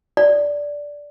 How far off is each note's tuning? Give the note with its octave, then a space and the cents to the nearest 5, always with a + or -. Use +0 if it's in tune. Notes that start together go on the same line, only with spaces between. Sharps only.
D5 -5